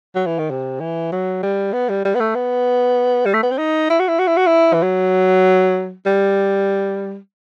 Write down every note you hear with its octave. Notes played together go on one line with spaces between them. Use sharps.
F#3
E3
D#3
C3
E3
F#3
G3
B3
G3
G3
B3
A3
B3
G3
A3
B3
C4
D#4
E4
F#4
E4
F#4
E4
F#4
E4
E3
F#3
G3